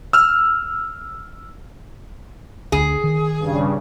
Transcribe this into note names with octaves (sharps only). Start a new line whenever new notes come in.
E6 F6
D2 G#4
D#3
G2 C#3